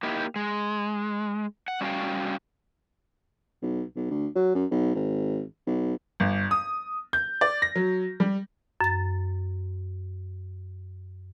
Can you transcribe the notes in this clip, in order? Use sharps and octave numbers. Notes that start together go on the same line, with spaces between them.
A#3 D#4 E4 G4
G#3
F#5
G3 C#4 F#4 E5 F5 G5
B1
B1
D2
F#3
F#2
B1
G#1
B1
G1
D#6
G6
D5
A#6
F#3
G3
F#2 A6